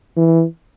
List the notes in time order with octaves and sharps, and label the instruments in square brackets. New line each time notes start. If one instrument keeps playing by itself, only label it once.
[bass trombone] E3